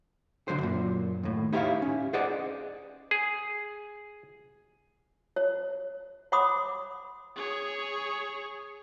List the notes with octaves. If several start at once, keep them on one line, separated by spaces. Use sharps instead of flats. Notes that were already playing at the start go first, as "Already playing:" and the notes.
C2 D3 F#3 C5
F#2 A#2
D#2 A2
D#4 E4 G4 A#4 C#5 F5
C#4
G#4 C5 D5 D#5 F#5
G#4
C#5
C#5 F#5 B5 C6 D6 D#6
G#4 C#5